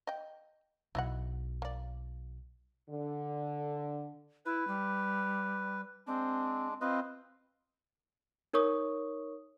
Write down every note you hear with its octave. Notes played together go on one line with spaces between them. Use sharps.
D#5 G5
B1 E4 D#5 F#5
A#3 D5
D3
E4 B4
G3
G#3 C4 D4
C4 F4 B4 D#5
D#4 A#4 C#5 C#6 D#6